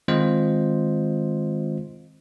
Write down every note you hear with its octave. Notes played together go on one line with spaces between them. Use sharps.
D#3 G#3 C4 F4 C5 D#5